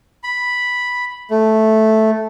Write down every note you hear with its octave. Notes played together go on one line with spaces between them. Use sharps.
B5
A3